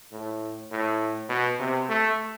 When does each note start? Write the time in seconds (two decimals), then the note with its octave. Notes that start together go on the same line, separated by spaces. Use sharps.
0.12 A2
0.71 A2
1.29 B2
1.59 C3
1.89 A3